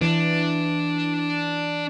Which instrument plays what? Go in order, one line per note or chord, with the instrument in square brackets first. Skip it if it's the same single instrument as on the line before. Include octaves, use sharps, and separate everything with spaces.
[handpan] E3 [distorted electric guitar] D4